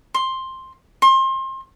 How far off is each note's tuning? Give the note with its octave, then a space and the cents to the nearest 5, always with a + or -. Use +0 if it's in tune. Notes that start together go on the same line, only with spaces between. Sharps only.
C6 +10
C6 +30